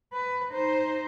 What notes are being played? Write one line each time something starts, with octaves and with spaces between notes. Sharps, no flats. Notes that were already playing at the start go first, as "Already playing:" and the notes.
B4
D#4 C5